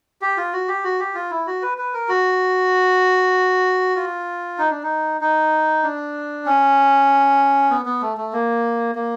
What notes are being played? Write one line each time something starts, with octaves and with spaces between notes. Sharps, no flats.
G4
F4
F#4
G4
F#4
G4
F4
E4
F#4
B4
B4
A#4
F#4
F4
D#4
D4
D#4
D#4
D4
C#4
B3
B3
A3
A3
A#3
A#3